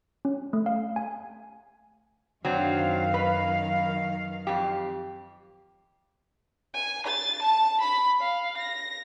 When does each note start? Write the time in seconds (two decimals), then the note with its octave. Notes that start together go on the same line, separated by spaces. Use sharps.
0.25 C#4
0.53 A3
0.66 F5
0.96 G#5
2.45 F#2 D#3 F#3 C4 D4 F5
3.14 B4
4.47 F2 G4
6.74 G#5
7.06 A6
7.42 A5
7.81 B5
8.21 F5
8.57 A#6